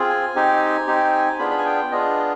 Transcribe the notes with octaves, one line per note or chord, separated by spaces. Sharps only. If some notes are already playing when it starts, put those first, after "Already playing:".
Already playing: C4 F4 G#4
G#5
C4 D#4 G4
C4 D#4 G4
B3 D4 F4 G#4 B5
B5
G#5
G5
B3 D4 F4 G#4 D#5